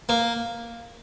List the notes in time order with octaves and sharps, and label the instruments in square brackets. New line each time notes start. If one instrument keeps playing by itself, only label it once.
[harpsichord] A#3